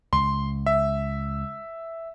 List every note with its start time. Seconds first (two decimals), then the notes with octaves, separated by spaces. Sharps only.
0.13 C#2 C6
0.66 E5